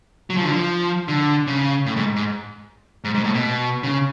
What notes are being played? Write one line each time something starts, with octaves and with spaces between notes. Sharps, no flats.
F#3
F3
D3
F3
D3
C#3
A2
G#2
G#2
G#2
G#2
A2
B2
C#3